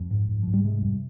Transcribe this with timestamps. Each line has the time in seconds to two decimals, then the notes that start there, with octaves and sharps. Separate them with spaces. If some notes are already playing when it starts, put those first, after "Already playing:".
Already playing: F2 F3
0.11 G#2
0.29 G#2
0.43 G#2 F3
0.54 G3
0.64 C3 G#3
0.82 F2 G3